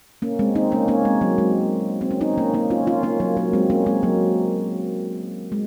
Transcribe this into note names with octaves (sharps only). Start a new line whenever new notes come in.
A#3 C#4
G#3 C4
C4 D#4
A#3 C#4
A#3 C#4
G#3 C4
F#3 A#3
G#3 C4
C4
C#4
C4 D#4
A#3 C#4
A#3 C#4
C#4 F4
C#4 F4
A#3 C#4
F#3 A#3
F#3 A#3
G#3 C4
A#3 C#4
G#3 C4
F#3 A#3
G#3